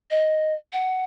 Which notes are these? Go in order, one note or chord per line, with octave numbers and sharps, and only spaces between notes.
D#5
F#5